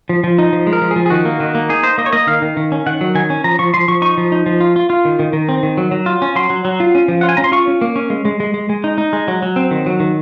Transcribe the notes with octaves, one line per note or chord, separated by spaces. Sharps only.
F3
F3
D#4
F3
G#3
A#4
F3
G#4
F3
G#4
D#3 F#4
A#3
D#3
A#3
D#4 G#4
D#4 C5
A#3 D#5
C#5
A#3 D#5
D#3 F5
D#3
D#3
C#4
D#3 F#5
F#3
D#3 G#5
C#4
F3 A#5
F3 C#6
F3 C6
F3 C#6
D#4 C#6
F3
D#4
F3
F4
F4
F4
D#3
D#3
D#3
C4
D#3
F#3
F#3
F4
C#4
F#3 C6
F#3
F#3
F4
C#4
F3
F4 F#5
G#5
C#4 A#5
C6
F4 C#6
C#4
A#3
C#4
G#3
G#3
G#3
G#3
G#3
D#4
D#4
G#3
F#3
F#3
C4
D#3
F#3
D#3